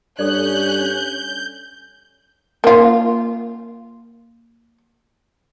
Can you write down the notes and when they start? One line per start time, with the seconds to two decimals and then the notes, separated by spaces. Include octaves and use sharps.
0.19 G2 C#4 A4 C#5 D5 F#6 G6
2.64 A#3 F4